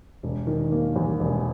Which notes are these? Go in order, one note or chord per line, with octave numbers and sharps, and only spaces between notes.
E1
D#3
A#3
E2
E1